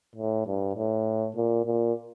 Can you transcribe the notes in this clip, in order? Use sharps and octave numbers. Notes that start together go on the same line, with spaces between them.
A2
G2
A2
A#2
A#2